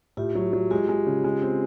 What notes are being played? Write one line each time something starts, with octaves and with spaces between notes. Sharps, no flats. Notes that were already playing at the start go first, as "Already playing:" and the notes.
A2 F4 G4
F#3
F#3
G#3 F4 G4
G#3
C#3
G#3
C4